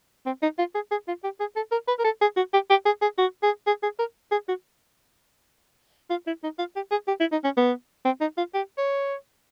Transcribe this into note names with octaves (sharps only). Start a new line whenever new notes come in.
C4
D#4
F4
G#4
G#4
F4
G4
G#4
A4
A#4
B4
A#4
A4
G#4
F#4
G4
G4
G#4
G#4
F#4
G#4
G#4
G#4
A#4
G#4
F#4
F4
E4
D#4
F4
G4
G#4
G4
E4
D#4
C#4
B3
C4
D#4
F4
G4
C#5